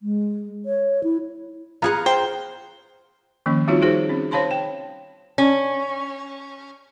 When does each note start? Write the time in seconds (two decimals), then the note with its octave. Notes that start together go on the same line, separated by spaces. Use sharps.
0.01 G#3
0.66 C#5
1.04 E4
1.82 B3 F4 G#4 F#5 A#5
2.06 C5 G5
3.46 D#3 F3 A#3 C#4
3.68 G3 C4 D#4 F4 F#4 C#5
3.82 D#4 F#4 G#4 C5
4.09 C4 C#4
4.31 C5 C#5 F5 A5 B5 C6
4.51 G5
5.38 C#4